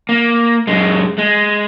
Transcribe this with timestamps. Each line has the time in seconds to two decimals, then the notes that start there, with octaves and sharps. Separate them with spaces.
0.09 A#3
0.67 F#2 G#3
1.18 G#3